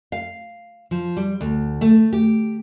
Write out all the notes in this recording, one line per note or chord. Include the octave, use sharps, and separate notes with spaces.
F5
F3
G3
D2
A3
G4